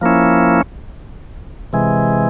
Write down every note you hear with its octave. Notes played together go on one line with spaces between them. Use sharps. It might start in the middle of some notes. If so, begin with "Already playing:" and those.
F3 A#3 C#4 E4
C3 E3 G#3